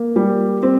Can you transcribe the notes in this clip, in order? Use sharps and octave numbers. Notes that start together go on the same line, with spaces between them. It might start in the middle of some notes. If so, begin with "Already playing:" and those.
Already playing: A#3
G3
C4